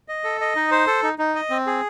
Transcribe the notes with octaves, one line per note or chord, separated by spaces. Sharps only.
D#5
A4
D#5
D#4
C5
A4
D#4
D#4
D#5
C4
G#4